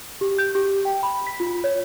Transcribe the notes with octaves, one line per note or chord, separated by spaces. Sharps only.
G4
G6
G4
G5
B5
B6
F4
C#5